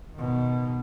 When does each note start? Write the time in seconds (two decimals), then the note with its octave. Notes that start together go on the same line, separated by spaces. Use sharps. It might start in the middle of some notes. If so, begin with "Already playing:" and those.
0.14 B2 D#3